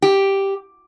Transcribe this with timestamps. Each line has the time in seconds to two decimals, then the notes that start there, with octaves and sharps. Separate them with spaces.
0.02 G4